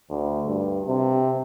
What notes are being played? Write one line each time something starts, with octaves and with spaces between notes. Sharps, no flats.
D2
G2
C3